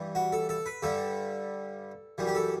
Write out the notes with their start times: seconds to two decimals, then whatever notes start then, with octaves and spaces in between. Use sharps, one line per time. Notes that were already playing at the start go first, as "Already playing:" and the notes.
Already playing: G2 E3 G3
0.15 F#4
0.32 A4
0.49 A4
0.66 B4
0.83 G2 D3 G3 A4
2.18 F#2 E3 G3
2.27 G4
2.35 A4